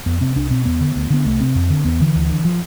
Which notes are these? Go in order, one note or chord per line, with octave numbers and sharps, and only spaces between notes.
F2 B3
C3 C4
C2 D4
B2 C4
E2 B3
D3
D2
D3 B3
C2 A3
C3 C4
F2
D3
E2 B3
D3 E3
D2
D3
F3